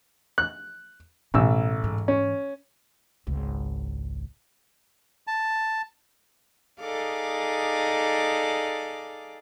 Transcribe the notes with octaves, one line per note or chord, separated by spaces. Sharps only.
F#6
A1 B2 G#3 E6
G#2 E3
C#4
G#1 C#2
A5
D#4 G#4 A4 D5 F5 D6